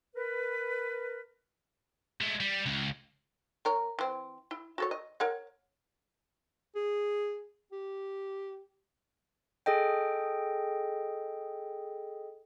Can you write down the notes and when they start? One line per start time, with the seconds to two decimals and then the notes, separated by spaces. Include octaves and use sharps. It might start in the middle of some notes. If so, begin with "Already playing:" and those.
0.15 A#4 B4
2.21 G#3 A3
2.40 G3
2.66 C#2
3.65 A#3 A#4 C#5
3.99 E3 C4
4.51 E4
4.78 F#4 A4 C#5
4.91 D#5
5.20 A#4 C#5 F#5
6.75 G#4
7.72 G4
9.66 G#4 A4 D#5 G5